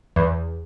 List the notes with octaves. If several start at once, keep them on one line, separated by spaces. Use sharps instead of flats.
E2